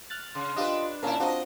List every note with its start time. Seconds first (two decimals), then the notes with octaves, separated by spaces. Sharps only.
0.10 F6 F#6 A6
0.35 C#3 C6
0.56 D4 F4 G4 B4 D#5
1.03 A#2 A#3 C#4 E4 A#4 A5 A#5
1.20 C4 D4 F4 F#4 A4 D#5